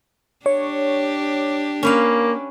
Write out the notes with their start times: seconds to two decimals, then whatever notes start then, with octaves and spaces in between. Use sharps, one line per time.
0.46 D4 G4 C#5
1.83 A#3 C#4 B4 F5